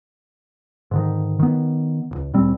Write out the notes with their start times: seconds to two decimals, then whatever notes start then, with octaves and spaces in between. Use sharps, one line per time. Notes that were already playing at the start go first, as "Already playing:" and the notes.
0.91 G#2 D3 D#3
1.39 D#3 B3
2.11 D1 C#2
2.34 D1 A#2 G3 C4